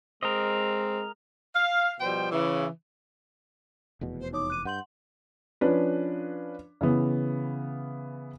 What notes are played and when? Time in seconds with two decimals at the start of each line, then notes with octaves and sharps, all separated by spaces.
0.23 G#3 C4 A#4 D#5
1.55 F5
2.01 B2 F3 G3 C5 G5
2.32 C#3 E3
4.01 F1 E2 B2
4.20 C5
4.33 D#4 C#5 D6 D#6
4.50 F#6 D#7
4.65 G2 F#5 C6 G6 F#7
5.61 F3 C#4 D4 B4
6.81 C#3 E3 B3